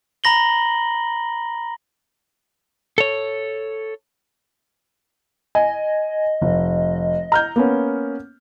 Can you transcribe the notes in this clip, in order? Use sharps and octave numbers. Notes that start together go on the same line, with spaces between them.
A#5 B5 A#6 F#7 G7
A4 C#5
D#5 G#5
F1
A#5 F6 G6
A#3 B3 C#4